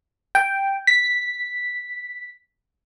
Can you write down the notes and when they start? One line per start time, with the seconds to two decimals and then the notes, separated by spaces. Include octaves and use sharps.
0.35 G5
0.87 B6